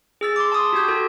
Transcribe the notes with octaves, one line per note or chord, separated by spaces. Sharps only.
G#4 E6 A6
C6 D6
A5 C6 D#6
F#4 G4 G6
F#4 A4